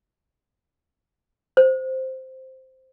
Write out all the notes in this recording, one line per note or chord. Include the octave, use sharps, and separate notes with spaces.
C5